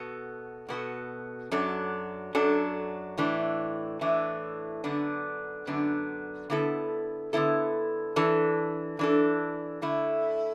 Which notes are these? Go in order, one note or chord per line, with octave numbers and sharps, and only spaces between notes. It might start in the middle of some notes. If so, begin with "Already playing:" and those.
Already playing: B2 B3 F#4 A4
B2 B3 F#4 A4
F#2 F#3 D4 A4
F#2 F#3 D4 A4
A2 E3 A3 D4
A2 E3 A3 D4
F#2 D3 B3 D4
F#2 D3 B3 D4
D3 B3 E4 A4
D3 B3 E4 A4
E3 D4 A4
E3 D4 A4
D3 A3 E4